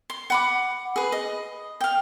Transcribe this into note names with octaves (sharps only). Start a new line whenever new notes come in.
C6
F#5 B5 D6
G#4 B4
D#5
F5 G5